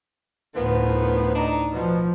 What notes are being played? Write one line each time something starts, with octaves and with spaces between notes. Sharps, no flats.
D2 A2 D#3 F3 B3
D4 D#4
B2 F3